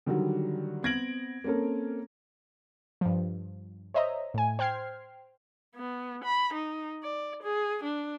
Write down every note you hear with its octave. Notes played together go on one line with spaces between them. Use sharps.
D3 D#3 F#3 G3 F#4
B3 C4 G#6 A#6 D7 F#7
A#3 C4 C#4 A4 A#4
G2 F3
C5 C#5 D#5 E5 A#5
A2 G#5
C5 G5 F6 G#6 C7
B3
B5
D#4
D5
G#4
D4